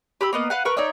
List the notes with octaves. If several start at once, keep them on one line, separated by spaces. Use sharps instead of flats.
G4 B5 E6
A#3 B3 D#5
B4 F5 F#5
A#4 B4 C#6
D#4 C#5 D5 E5